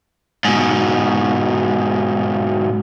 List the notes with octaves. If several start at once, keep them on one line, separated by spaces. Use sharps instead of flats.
G#2 B2